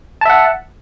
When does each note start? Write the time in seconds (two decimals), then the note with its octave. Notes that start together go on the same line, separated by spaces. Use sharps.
0.21 A5
0.25 E5
0.30 F#5